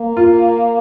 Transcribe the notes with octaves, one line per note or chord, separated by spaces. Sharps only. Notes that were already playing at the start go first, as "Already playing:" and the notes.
Already playing: A#3
F4